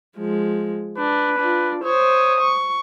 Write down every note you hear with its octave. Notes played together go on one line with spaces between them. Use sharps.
F3 G#3
D4 B4
D4 F4
C5 C#5 D#6
C#6